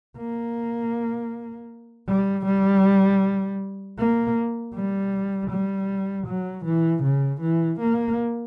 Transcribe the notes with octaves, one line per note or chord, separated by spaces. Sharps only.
A#3
G3
G3
A#3
G3
G3
F#3
E3
C#3
E3
A#3